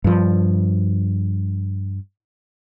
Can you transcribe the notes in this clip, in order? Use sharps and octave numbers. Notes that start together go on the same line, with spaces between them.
G2 F3